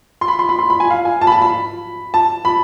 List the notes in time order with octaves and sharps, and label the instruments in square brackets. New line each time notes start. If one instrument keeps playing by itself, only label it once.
[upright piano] C6
B5
C6
B5
C6
B5
G#5
F5
G#5
A5
B5
A5
B5
A5
B5